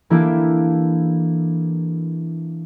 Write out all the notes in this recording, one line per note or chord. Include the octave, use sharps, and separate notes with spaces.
E3 A#3 D4 E4 G4 A4